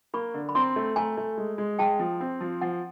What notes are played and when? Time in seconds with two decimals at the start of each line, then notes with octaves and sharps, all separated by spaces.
0.14 A#3 B5 C#6
0.34 D3
0.49 B5
0.55 C4 A#5 C6
0.76 A3
0.96 A3 G#5 A#5
1.17 A3
1.37 G#3
1.58 G#3
1.79 G#3 G5 A5
1.99 F3
2.21 C4
2.41 F3
2.61 F3 F#5 G#5